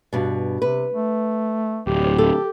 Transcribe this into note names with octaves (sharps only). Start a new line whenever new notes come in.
G2 B2
C3 B4
A3
D1 G4
A4